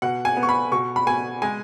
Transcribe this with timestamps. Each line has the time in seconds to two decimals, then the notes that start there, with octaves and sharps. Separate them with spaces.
0.02 B2 F#5
0.25 G#5
0.37 B3
0.43 C#6
0.49 B5
0.72 B2 C#6
0.96 B5
1.07 B2 G#5
1.42 G#3 G#5